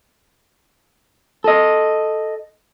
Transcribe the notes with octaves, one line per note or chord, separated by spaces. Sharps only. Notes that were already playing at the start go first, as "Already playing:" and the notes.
A4 D#5